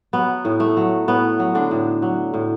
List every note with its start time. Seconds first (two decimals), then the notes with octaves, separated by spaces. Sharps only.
0.13 F#3 B3
0.45 A2
0.60 A3
0.77 F#3
1.08 A2 B3
1.40 F#3
1.55 D3 D4
1.71 A2
2.02 F#3
2.34 A2